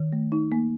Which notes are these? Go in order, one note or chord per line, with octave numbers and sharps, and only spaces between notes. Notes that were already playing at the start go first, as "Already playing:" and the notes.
Already playing: D#3
A3
D#4
A#3